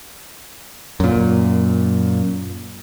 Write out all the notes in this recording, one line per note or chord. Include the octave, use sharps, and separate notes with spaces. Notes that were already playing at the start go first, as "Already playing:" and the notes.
F#2 A#2